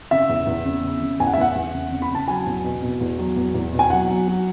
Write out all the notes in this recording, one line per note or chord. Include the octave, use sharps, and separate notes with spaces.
C#3 E5
E2
E2
C#3
C#3
C#3
E2 G#5
F#5
E5
E2 F#5
E2
C#3
C#3
B5
C#3 A5
F#3 G#5
E2
B2
B2
E2
F#3
E2
E2
B2
G#5
F#3 F#5
F#3
F#3